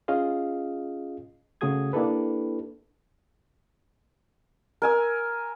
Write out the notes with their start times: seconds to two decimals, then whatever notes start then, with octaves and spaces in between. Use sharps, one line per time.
0.08 C#4 F4 G#4 D#5 F5
1.61 C#3 A3 F#4 G#4 D#6 G#6
1.93 A#3 D4 E4 G4 A4 B4
4.82 A#4 G#5 E6